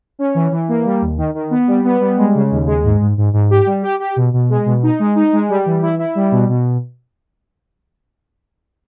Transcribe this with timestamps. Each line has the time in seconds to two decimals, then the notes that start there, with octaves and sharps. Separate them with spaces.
0.19 C#4
0.35 E3
0.52 E3
0.68 A#3
0.85 G3
1.01 D#2
1.17 D#3
1.35 D#3
1.50 B3
1.68 G3
1.84 B3
2.00 G3
2.17 G#3
2.34 C#3
2.51 D#2
2.67 G#3
2.84 G#2
3.00 G#2
3.17 G#2
3.33 G#2
3.50 G4
3.66 G3
3.83 G4
4.00 G4
4.16 B2
4.33 B2
4.50 G#3
4.66 B2
4.83 D#4
4.99 G#3
5.15 D#4
5.33 G#3
5.49 G3
5.66 E3
5.82 E4
5.99 E4
6.15 G3
6.31 B2
6.49 B2